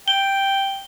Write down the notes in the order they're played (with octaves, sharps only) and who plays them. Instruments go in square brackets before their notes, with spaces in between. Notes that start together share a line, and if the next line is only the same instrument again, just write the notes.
[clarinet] G5 [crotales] G7